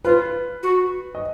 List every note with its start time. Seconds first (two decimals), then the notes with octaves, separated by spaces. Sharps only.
0.04 F4 B4
0.63 F#4
1.15 D#5